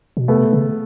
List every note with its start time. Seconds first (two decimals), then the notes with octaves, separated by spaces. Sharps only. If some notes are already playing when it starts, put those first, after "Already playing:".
0.17 B2
0.28 C3 A3 B3
0.53 C#3